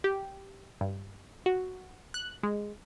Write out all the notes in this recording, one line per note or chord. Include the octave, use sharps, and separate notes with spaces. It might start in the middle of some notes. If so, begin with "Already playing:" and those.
G4
G2
F#4
F#6
G#3